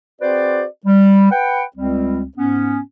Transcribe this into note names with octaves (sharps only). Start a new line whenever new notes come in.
C4 F#4 G#4 B4 C5 D5
G3
B4 F#5 G5
C#2 G3 C4
G#2 B3 C#4